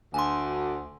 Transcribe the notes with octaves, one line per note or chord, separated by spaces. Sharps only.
D2 G#5 C6